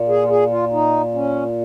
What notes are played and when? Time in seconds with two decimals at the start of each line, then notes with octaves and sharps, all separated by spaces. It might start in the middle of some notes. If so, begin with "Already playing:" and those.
Already playing: A#2
0.09 G#4
0.24 F4
0.29 G#4
0.50 F4
0.72 D#4
1.14 C#4